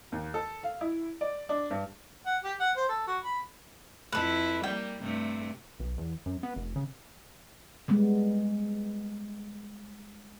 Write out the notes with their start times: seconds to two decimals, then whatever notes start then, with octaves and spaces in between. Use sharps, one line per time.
0.12 D#2
0.34 A4
0.63 F5
0.81 E4
1.21 D5
1.49 D4
1.70 G2
2.26 F#5
2.44 G4
2.60 F#5
2.77 C5
2.89 A4
3.07 F#4
3.24 B5
4.12 F2 E4 A4 B4
4.63 G3 A#3 G5
5.01 G2 C3 A3
5.80 B1
5.98 E2
6.26 F#2
6.43 B3
6.56 F1
6.76 C#3
7.88 G3 G#3 B3